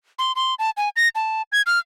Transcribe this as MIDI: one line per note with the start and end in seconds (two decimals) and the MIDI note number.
0.19 0.32 84
0.36 0.54 84
0.59 0.70 81
0.77 0.89 80
0.96 1.08 94
1.15 1.42 81
1.52 1.62 92
1.67 1.79 89